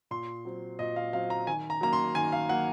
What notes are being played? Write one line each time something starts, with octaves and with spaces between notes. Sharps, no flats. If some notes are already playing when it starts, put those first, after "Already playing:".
A#2 C6
F#3 C4
A#2 D#5
F5
F#3 C4 F5
A#5
D#3 G#5
A#5
F#3 A#3 A#5
C6
D#3 G#5
F5
F#3 A#3 F#5